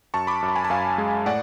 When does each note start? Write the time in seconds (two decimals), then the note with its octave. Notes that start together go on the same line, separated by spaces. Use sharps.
0.14 F#2 A5 C#6
0.27 B5 D6
0.42 F#2
0.48 A5
0.55 G#5 B5
0.64 A5
0.70 F#2 F5 G#5
0.98 G#3
1.26 A2 D5 F#5